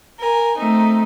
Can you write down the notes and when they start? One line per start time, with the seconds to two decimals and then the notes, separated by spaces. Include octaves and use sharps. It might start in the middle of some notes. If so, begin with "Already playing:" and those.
0.19 A#4 G#5
0.55 A3 C4 D#4